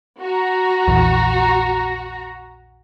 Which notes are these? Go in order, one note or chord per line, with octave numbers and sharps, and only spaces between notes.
F#4 A#5
A#1 E2